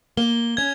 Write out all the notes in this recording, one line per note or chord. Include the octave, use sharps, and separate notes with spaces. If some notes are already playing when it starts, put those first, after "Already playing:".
A#3 G7
C#4 G#6